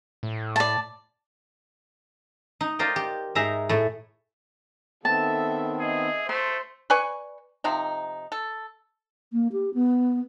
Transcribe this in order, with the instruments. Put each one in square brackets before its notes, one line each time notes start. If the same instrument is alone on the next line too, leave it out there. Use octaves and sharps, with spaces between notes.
[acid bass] A2
[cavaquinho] D5 A5
[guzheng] D#4
F4 A#4 C5 D5 D#5 G5
G4
G#2 G#3 D#4 E5 A#5
A2 A3
[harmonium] D#3 B3 C4 [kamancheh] A4 E5 [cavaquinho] A5
[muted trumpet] G#4 [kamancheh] D#5 E5
[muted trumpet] A3 [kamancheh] C5 [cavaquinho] C6
[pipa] B4 D5 G#5 C#6
C3 F3 D#4
A4
[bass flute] A#3
G4
B3